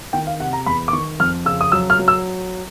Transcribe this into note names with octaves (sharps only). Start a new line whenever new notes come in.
D#3 G5
F5
C3 F#5
A#5
E2 B5
D6
D#3 C#6
F2 F6
C#3 E6
D#6
F#3 E6
F6
F#3
E6